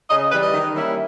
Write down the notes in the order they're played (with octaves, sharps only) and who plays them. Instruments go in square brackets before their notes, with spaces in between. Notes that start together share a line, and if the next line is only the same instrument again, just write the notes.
[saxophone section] C#3 D#5
E3 G3 B4
D#5
D#3
G3 A#3 C#4 E4